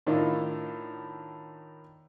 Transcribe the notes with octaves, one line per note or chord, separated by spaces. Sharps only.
A2 D#3 D4 E4 F4